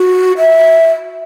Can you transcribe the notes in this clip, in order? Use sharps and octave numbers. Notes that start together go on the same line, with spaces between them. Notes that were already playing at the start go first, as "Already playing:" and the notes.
Already playing: F#4
E5